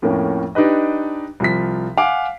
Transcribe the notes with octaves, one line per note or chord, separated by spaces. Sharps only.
F2 A2 A3 A#3 C#4
D4 D#4 G4 B4 D#5
C2 F3 B6
F5 F#5 G#5 D6 D7